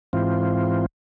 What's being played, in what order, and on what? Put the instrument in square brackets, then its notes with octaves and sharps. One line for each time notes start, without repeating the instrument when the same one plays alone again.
[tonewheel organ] G#2 E3 C4 F4